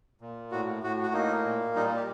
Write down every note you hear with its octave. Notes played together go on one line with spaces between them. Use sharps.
A#2
A2 F#4
A2 F#4
F#4
A#3 D#4
A#2
G3 D#4
G4